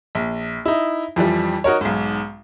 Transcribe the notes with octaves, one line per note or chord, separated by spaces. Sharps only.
A#1
D#4 E4
F2 E3 F3 G3
D#4 F#4 A#4 C#5
B1 G#2